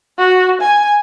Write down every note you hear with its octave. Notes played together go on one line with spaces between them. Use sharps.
F#4
G#5